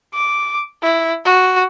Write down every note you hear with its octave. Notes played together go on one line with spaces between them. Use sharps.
D6
E4
F#4